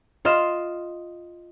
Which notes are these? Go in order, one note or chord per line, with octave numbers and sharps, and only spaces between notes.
F4 D#5 C6 F6 E7